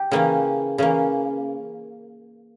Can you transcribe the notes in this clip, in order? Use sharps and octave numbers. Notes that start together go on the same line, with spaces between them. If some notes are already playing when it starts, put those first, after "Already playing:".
Already playing: G4
C#3 E3 A#3 C#4
C#3 E3 A#3 C#4